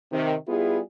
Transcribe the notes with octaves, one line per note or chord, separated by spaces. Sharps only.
C3 D#3
G3 B3 E4 F4 G#4